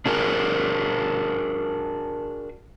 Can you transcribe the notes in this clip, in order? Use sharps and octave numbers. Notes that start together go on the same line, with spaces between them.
D4 F#4 G#4 A#4